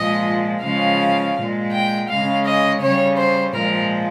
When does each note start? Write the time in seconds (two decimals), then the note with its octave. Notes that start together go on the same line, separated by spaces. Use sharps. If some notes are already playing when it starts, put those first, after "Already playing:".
Already playing: A#2 F3 G#3 D#5
0.64 C#3 F3 G#3 F5
1.37 A#2 G#3
1.73 G5
2.09 C#3 G#3 F5
2.46 D#5
2.82 C#3 G3 C#5
3.18 C5
3.54 A#2 F3 G#3 A#4